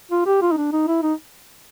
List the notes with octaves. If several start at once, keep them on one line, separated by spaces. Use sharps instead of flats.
F4
G4
F4
D#4
D4
D#4
E4
D#4